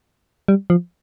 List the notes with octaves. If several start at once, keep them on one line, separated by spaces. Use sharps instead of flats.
G3
F3